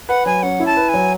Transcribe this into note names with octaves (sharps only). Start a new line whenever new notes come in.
B4 F#5
F#3 G#5
C#4 F#5
E4
A5
B4
F#3 G#5